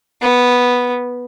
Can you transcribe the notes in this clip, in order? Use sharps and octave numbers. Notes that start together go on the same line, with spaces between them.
B3